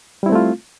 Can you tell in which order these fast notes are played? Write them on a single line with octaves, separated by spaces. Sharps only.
G3 E4 C4 A3 F4